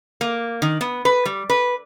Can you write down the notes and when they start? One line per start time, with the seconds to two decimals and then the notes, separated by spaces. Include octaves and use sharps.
0.21 A#3
0.62 D#3
0.81 B3
1.05 B4
1.25 G3
1.49 B4